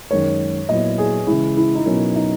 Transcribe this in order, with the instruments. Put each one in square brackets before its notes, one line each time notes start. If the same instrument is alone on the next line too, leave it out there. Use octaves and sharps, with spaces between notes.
[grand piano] F#2 D#3 G#3 D#4 A#4 [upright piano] C#5
[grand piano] A#2 F#3 B3 E4 [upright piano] D#5
[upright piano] G#4
[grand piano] C#3 E3 G#3 [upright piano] E4
[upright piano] E4
D#4
[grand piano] B2 F#3 B3 F#4 A#4 [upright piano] C#4
[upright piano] D#4